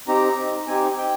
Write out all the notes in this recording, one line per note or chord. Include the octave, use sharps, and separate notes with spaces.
C4 D#4 G4 A#5
C4 D#4 G4 G#5
G5